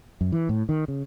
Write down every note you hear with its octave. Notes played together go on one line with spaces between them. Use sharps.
F#2
E3
A2
D#3
C#3